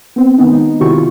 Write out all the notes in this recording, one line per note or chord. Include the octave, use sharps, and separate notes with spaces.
B3 C4
D#3 B3 D#4
G#3 D#4
C3 D#3 E4 F#4 G4 C#6
F4